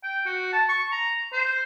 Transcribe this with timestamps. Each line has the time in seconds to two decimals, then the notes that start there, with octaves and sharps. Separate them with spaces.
0.03 G5
0.25 F#4
0.53 A5
0.69 C#6
0.92 A#5
1.33 C5